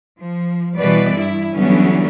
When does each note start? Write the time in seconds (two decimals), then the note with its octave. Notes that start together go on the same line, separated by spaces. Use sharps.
0.20 F3
0.77 B2 E3 G3 B4 D5
1.13 G2 E4
1.54 D3 E3 F#3 G3 B3 C#4